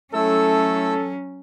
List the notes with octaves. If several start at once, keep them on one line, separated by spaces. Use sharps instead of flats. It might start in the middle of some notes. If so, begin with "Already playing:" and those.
F#3 A3 C#4 E4 A4 E6